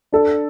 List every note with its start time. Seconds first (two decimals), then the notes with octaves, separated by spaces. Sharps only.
0.12 D4 A4